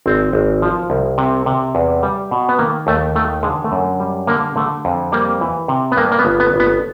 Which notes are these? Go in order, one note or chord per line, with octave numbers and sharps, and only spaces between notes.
G#1 C4
G#1
F3
C2
C3
C3
E2
G3
B2
B3
D#3 A#3
D#2 A3
D#3 A3
D3 G#3
A3
F#2
G3
D3 A#3
D3 A3
F2
G3 A#3
E3
C3
B3
G2 A#3
A#3
B3
G1
B3
G1
B3